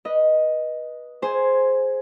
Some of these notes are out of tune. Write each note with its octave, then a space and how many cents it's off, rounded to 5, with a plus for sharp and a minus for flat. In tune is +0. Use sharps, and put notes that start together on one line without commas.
B4 -20 D#5 +0
G#4 +10 C5 +0 G#5 +0